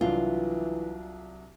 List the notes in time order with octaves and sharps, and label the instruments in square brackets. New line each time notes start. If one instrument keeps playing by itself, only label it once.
[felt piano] C2 F#3 D4 [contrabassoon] E3 [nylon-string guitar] F4